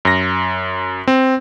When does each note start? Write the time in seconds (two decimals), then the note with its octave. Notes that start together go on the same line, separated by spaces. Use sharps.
0.05 F#2 A#6
1.08 C4